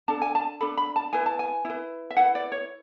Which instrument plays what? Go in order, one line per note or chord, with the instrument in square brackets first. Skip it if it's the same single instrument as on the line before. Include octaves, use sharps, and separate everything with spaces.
[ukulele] D4 A4 A5
G#5
A5
D4 A4 B5
B5
A5
E4 B4 G#5
A5
G#5
E4 B4
E5
E4 B4 F#5
D5
C#5